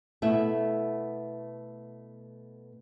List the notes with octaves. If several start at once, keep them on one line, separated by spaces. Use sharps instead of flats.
B2 A3 B3 E4 E5